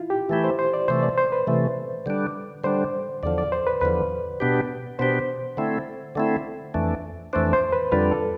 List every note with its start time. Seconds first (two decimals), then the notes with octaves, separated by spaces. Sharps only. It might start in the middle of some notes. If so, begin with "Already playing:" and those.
Already playing: E4 F4
0.10 G4
0.29 E3 A3 E4 G4
0.44 C5
0.59 C5
0.74 D5
0.88 C3 E3 A3 C5
1.03 D5
1.18 C5
1.32 B4
1.47 C3 E3 A3
2.06 D3 G3 D4
2.64 D3 G3 D4 C5
3.23 E2 D3 F3 D5
3.38 D5
3.52 C5
3.67 B4
3.81 E2 D3 F3 B4
4.40 B2 B3 D4 G4
4.99 B2 B3 D4 G4 C5
5.57 D3 A3 C4 E4
6.15 D3 A3 C4 E4
6.74 F2 E3 A3 D4
7.33 F2 E3 A3 D4 C5
7.53 C5
7.73 B4
7.92 F2 D3 G3 D4 F4 B4
8.11 A4